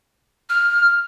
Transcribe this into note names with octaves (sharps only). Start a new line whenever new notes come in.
F6